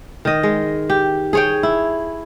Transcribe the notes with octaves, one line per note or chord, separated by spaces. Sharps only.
D#3 D#5
G#3
G4
G#4 C#5 G5
E4